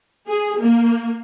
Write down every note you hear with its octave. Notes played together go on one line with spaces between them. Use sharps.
G#4
A#3